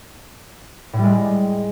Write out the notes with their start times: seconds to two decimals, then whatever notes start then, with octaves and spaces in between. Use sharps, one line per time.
0.93 A2
0.98 G3
1.04 G#3